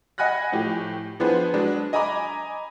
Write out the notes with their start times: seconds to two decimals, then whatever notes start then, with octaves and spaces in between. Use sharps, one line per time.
0.18 D#5 F#5 G#5 B5 F#6 A#6
0.52 A2 F3 G4
1.20 F3 B3 D4 G#4 B4 C5
1.54 F#3 G#3 D4 B4
1.93 D#5 G#5 A#5 B5 D6